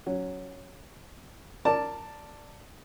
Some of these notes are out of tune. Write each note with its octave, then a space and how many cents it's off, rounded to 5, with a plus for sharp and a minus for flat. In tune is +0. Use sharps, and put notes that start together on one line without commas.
F#3 +0 C#4 +0
A#4 -15 D5 +0 A5 +5